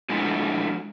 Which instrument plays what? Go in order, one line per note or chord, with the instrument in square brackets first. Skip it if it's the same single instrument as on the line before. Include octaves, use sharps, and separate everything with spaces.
[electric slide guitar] F3 G#3 A3 D4 E4 F#4